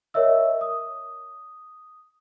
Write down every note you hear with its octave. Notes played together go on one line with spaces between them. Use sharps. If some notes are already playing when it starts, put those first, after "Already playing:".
A#4 C#5 D#5 E5 E6
D#6